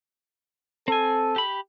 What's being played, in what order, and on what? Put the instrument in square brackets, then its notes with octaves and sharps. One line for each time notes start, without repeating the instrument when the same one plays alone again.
[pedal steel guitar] C4 G#5 [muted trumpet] A4
[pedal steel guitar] G4 B5